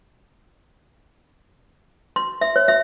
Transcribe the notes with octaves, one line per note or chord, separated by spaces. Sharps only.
C6
E5
C#5
E5